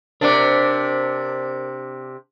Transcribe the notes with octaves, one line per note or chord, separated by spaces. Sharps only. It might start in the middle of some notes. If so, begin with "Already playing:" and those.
C3 D4 A#4 C5 D5